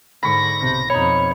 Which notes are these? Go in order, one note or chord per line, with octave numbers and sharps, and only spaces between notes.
G#2 D3 B5 C#6 A#6
B1 C3
F2 B2 D#4 C#5 B5